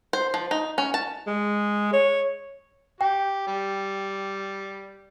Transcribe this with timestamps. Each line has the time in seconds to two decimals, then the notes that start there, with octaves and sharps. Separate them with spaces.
0.13 C5
0.34 F3
0.51 D#4
0.78 C#4
0.94 A5
1.27 G#3
1.93 C#5
3.01 G4 G5
3.47 G3